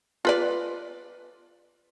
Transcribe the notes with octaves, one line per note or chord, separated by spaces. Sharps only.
F4 B4 D5